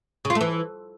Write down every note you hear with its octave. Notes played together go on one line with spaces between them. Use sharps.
C#3
F4
A3
E3